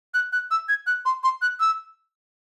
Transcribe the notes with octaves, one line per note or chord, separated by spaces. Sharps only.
F#6
F#6
E6
G#6
F#6
C6
C6
F#6
E6